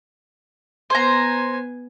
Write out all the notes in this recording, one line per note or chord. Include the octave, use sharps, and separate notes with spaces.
B3 C5 G#5 A#5